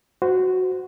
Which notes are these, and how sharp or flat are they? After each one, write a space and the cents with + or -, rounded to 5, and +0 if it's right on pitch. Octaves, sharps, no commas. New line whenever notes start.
F#4 +0 C5 -25